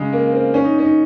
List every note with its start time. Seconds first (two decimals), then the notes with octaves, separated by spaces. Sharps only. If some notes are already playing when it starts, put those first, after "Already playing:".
Already playing: C#3 G#3
0.13 A#3
0.32 C4
0.54 C#4
0.64 D#4
0.79 C#4
0.84 D#4